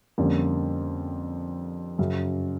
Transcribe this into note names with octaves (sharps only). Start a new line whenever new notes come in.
F2 D3 G3 A#3 C#4
F#2 C#3 F#3